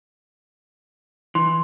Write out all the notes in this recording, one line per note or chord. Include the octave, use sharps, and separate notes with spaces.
E3 C6